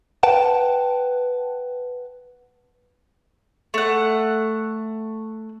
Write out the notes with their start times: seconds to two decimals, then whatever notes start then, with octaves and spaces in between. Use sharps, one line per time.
0.23 B4 F#5 G5 A5
3.74 A3 F#5